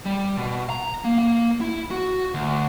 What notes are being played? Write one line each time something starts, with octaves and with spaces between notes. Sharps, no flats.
G3
B2
A#5
A#3
A#3
E4
F#4
D2